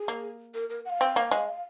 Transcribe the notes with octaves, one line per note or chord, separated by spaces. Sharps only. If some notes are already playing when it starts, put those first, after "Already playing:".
Already playing: G#4
A#3
A#4
A#4
F#5
F5
C4
A#3
G#3